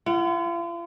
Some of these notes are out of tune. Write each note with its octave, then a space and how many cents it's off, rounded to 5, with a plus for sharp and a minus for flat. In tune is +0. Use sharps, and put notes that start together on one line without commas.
F4 -40 F#5 +0